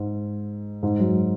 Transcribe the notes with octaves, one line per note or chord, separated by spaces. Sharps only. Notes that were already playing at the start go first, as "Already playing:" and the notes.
Already playing: G#2
G#2
F#2